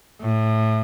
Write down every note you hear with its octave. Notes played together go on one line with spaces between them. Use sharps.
A2